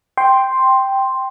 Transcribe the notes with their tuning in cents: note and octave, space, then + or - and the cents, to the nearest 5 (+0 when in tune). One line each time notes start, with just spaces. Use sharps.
G5 +0 C6 +0